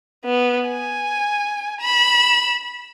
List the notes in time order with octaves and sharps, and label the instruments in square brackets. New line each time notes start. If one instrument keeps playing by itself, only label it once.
[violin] B3
G#5
B5 E7